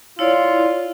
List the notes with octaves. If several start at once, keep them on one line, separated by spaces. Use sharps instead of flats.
E4 F4 C#5 D5